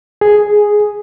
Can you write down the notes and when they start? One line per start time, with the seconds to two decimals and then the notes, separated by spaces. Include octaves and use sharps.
0.21 G#4